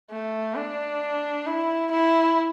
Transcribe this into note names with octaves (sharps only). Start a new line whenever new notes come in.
A3
D4
E4
E4